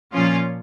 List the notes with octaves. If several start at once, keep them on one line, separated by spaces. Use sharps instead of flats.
A#2 F3 C#4 F4